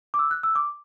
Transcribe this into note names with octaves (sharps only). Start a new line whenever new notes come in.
D6
E6
F#6
E6
D6